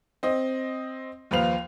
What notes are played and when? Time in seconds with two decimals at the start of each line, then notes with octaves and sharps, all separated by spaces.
0.23 C4 D#5
1.31 D#2 F3 B4 F5 F7